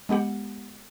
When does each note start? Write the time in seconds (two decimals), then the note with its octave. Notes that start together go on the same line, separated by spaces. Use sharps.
0.09 G#3 B3 G4 F#5